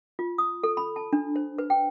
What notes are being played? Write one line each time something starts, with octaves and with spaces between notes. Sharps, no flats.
F4
D#6
A4
B5
A5
D4
C5
B4
G5